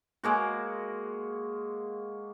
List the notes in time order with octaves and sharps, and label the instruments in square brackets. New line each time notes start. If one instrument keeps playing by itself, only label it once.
[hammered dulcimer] G#3 A#3 F#4